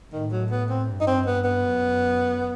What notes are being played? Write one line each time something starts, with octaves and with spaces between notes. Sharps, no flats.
A2 D#3
F#3
B3
C4
G2
D#4
C4
B3
B3
F#2